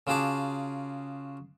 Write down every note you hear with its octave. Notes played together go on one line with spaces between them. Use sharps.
C#3 F4 F#4 G#4 A5 D6